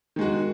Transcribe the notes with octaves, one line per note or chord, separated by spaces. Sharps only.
D#3 G#3 F#4